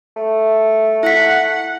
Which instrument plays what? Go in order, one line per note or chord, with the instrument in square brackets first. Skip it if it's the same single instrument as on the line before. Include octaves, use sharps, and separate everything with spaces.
[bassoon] A3
[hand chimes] E4 B6 [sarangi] F#5